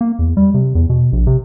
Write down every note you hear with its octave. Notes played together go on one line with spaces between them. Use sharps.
A#3
E2
G3
C3
E2
B2
A#1
C3